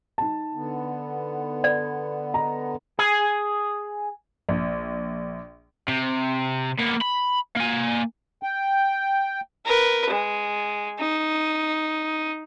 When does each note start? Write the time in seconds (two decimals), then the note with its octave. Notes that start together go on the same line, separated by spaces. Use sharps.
0.18 D#4 A5
0.54 D3 B3
1.64 D5
2.34 D#5 A#5
2.99 G#4 G#5
4.49 A#1
5.88 C3
6.80 A#3 B3
7.02 B5
7.56 A#3 G#5
8.43 G5
9.66 A#4 B4
10.10 G#3
10.99 D#4